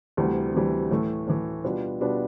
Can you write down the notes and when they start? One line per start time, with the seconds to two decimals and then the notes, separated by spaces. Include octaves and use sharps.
0.17 D2 C3 E3 G3
0.54 D2 C3 E3 G3
0.91 A2 E3 A3
1.27 A2 E3 A3
1.64 B2 G3 D4 F4 B4
2.01 B2 G3 D4 F4 B4